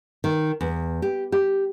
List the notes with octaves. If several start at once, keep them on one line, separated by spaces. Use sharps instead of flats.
D#3
E2
G4
G4